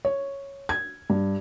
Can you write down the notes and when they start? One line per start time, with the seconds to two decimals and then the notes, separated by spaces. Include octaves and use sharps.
0.05 C#5
0.69 G#6
1.10 G2